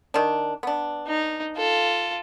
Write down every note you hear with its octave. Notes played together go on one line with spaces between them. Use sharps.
D#3 D4
B3 D4
D#4
F4 A4